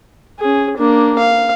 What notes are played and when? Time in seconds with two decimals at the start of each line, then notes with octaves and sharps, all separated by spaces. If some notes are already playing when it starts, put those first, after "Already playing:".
0.39 C#4 G#4
0.77 A#3 D4
1.18 F5